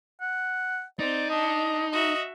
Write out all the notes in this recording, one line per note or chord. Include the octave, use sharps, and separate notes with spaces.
F#5
C4 D#4 D5
D4 D#5
F#4 D#5 E5